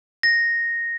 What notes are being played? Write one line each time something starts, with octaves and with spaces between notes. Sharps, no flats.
A#6